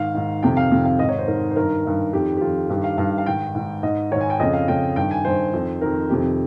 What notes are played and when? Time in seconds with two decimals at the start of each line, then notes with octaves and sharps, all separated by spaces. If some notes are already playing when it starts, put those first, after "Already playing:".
Already playing: G#2 D#3 F5
0.14 G#2 D#3
0.42 F2 C3 D#3 G5
0.57 F5
0.71 F2 C3 D#3
0.85 F5
0.99 G#2 D#3 D#5
1.09 C#5
1.19 C5
1.28 G#2 D#3 A#4
1.50 C5
1.56 G2 D#3 A#4
1.84 G2 D#3
2.13 F2 D#3 G4
2.37 G4
2.41 F2 D#3 F4
2.69 G2 D#3 G4
2.84 F5
2.98 G2 D#3 F5
3.18 F5
3.26 G#2 D#3 G5
3.55 G#2 D#3
3.83 G#2 D#3 D#5
4.11 D#3 C#5
4.15 G#2
4.21 G#5
4.30 G5
4.39 F2 C#3 D#5
4.53 F5
4.68 F2 C#3 G5
4.96 G2 D#3 G5
5.11 G#5
5.25 G2 D#3 C5
5.53 F2 D#3
5.81 F2 D#3 A#4
6.10 F2 C3 D#3 G4